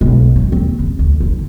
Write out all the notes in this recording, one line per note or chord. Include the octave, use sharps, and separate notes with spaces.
B1 G#3
F#3
D#2 C4
C#3
D2
D#2 D3